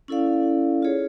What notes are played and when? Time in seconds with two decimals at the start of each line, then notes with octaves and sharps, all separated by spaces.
0.08 C#4 E4 A4 D5 F5
0.82 F4 G#4 C#5